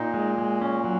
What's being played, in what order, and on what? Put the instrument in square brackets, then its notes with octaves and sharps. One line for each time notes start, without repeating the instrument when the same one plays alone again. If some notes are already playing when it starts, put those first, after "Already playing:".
Already playing: [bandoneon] A#2 [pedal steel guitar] D#4
[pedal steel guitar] G#3
G#3
C#4
F#3